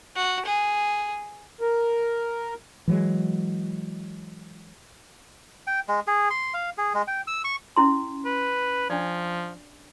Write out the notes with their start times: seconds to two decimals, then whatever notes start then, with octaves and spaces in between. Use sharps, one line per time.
0.16 F#4
0.45 G#4
1.61 A#4
2.88 E3 F#3 G#3
5.67 G5
5.88 G#3
6.07 G#4
6.30 C6
6.54 F5
6.78 G#4
6.94 G#3
7.07 G5
7.27 E6
7.44 C#6
7.76 C#4 E4 C6
8.25 B4
8.90 F3 D4 D5